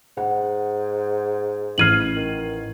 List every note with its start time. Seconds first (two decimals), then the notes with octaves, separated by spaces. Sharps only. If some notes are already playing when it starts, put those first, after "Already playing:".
0.17 G#2 F#5
1.78 A1 F6 G#6 C7 D#7 F#7
2.16 D#3